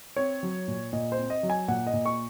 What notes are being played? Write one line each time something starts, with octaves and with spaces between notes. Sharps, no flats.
C4 C#5
F#3
A#2
A#2 D#5
C5
C4
D#5
F#3
G#5
A#2 F#5
D#5
A#2
C#6